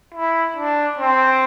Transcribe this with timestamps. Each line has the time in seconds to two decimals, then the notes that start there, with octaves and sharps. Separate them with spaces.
0.14 E4
0.56 D4
0.99 C4